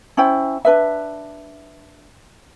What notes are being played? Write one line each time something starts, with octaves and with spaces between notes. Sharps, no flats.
C#4 E4 C5 G5
D4 B4 E5